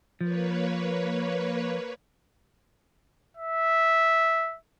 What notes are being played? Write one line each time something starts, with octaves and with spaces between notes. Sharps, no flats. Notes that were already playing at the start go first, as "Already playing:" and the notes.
F3 A#3 B4 C#5
E5